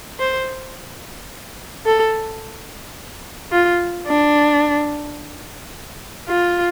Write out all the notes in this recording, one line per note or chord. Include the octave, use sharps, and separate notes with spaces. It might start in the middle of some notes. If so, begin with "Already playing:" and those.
C5
A4
F4
D4
F4